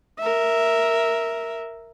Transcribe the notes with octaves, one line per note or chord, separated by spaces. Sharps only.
A#4 E5